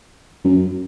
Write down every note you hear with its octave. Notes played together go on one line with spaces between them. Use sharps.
F#2